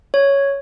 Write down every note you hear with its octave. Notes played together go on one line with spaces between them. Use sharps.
C#5